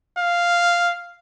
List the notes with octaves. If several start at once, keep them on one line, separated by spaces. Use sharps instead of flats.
F5